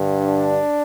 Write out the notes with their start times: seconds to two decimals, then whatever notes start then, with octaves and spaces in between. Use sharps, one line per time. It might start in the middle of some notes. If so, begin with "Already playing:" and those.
Already playing: G2 D3
0.18 D4